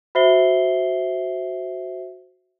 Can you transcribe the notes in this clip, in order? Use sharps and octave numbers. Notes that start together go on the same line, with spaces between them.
F#4 C5 E5 C7 G7